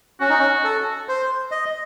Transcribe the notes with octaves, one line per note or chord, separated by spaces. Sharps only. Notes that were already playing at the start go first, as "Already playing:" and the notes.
C#4 F#4
D#4
C#4
A4
C5
D#5